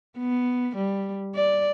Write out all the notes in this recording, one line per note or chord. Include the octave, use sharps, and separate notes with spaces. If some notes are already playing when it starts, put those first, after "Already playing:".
B3
G3
D5